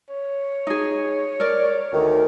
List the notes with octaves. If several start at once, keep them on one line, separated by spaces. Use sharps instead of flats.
C#5
D#4 G#4
A#4 D5
D2 D#3